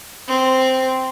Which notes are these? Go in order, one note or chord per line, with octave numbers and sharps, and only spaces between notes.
C4